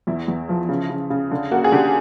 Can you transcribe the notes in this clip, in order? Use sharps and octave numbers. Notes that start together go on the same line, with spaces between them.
E2 E4
E2
F3
C#3
C#3
C#3
D3
A#3 F#4
G#4
D3 G4